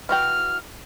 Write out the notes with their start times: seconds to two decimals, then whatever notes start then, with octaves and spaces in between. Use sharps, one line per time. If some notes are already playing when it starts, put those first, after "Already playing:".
0.09 E3 F#4 G5 F6